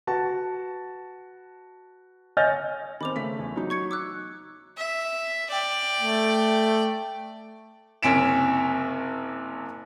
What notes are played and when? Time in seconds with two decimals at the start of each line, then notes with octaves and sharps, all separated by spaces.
0.07 F#4 B4 A5
2.37 C#5 D#5 G#5 F6 G6 A6
3.01 D#3 C4 B5 D6 F7
3.16 C#3 A3 B6
3.39 E2
3.56 F#3 D#4
3.70 C#6 G#6 C#7
3.91 D6 E6 F#6
4.78 E5
5.50 D5 G5
6.01 A3
8.03 F#1 C3 C#4 B6 D7 E7